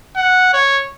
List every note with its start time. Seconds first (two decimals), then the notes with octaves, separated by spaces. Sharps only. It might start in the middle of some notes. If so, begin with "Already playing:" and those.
0.16 F#5
0.53 C#5